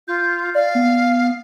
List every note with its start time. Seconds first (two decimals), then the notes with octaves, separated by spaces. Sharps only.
0.08 F4 G6
0.55 D5 F5
0.75 B3